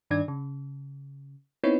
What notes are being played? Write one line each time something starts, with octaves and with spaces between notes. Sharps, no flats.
G2 D#3 D4 D5 G#6
C#3
B3 C4 D#4 E4 B4 C#5